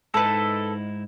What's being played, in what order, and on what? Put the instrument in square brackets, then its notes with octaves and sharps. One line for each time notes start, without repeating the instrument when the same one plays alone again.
[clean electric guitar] G#2 D#4 E4 [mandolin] A4 B4